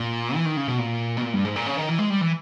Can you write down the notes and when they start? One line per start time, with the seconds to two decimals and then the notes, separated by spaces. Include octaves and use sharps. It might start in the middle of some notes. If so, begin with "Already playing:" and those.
Already playing: A#2
0.35 E3
0.45 D#3
0.57 C#3
0.68 B2
0.79 A#2
1.17 B2
1.22 A#2
1.33 G2
1.45 G#2
1.56 A#2
1.66 C#3
1.77 D#3
1.89 E3
1.99 G#3
2.10 G3
2.21 E3